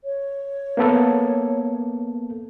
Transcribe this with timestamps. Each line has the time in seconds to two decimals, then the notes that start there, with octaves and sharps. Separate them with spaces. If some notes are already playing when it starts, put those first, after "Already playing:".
0.04 C#5
0.77 A#3 B3 A4